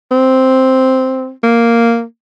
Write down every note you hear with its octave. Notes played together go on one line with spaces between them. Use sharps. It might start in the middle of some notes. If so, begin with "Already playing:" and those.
C4
A#3